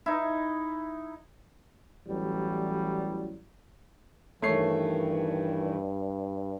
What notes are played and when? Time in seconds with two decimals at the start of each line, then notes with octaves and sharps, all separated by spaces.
0.06 D#4 E4
2.07 A1 E3 F#3 G3
4.42 G2 D#3 E3 A3 C#5 C7